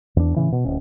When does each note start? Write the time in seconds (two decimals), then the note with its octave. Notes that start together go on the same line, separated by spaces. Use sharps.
0.16 E2 D4
0.36 A2 C#3 E3
0.52 B2
0.64 D1 C#4